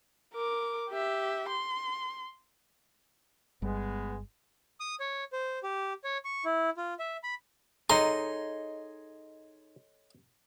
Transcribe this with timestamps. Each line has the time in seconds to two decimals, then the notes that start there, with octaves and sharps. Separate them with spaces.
0.33 A#4 D6
0.90 G4 E5
1.48 C6
3.62 G1 G3 G#3 B3
4.80 D#6
5.00 C#5
5.33 C5
5.63 G4
6.04 C#5
6.25 C#6
6.45 E4
6.77 F4
6.99 E5
7.24 B5
7.90 D#4 G#4 A4 C#5 D#5 A#5 C6